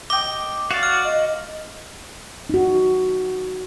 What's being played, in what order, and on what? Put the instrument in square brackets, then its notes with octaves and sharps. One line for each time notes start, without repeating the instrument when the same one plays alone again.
[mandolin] D#5 G5 [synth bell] D6
[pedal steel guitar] F#4 D5 [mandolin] F5
[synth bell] F6
[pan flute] D#5
[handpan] D#4 F#4